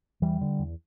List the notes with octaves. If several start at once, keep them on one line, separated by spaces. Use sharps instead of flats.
E2 E3 G3
D3
E2